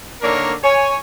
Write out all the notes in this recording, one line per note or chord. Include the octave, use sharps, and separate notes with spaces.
D3 A#3 D4 D#4 A#4 C#5
C#5 G#5